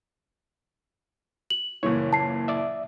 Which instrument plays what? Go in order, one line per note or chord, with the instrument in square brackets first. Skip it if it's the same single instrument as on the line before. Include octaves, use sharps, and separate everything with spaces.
[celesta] F#7
[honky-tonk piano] F#1 A#2 E3 [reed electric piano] C#5
[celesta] A5 C7
[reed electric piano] D5 E5